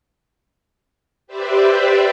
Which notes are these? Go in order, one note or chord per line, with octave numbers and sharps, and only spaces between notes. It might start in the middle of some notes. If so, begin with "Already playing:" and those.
G4 B4 C5 D5 E5